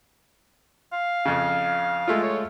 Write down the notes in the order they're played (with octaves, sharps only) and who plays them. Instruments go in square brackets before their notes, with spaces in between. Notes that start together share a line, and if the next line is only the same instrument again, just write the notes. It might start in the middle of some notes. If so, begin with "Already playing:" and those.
[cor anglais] F5
[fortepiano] F2 C#3
G#3 A3 F4
[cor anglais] C#5